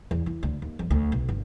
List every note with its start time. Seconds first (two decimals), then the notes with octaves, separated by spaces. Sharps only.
0.11 E2
0.26 E3
0.43 D2
0.62 D#2
0.79 F2
0.91 D2
1.12 B1
1.29 G1